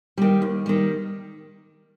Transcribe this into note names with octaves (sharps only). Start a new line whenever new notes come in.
D#3 G3
D#2
D#3 G3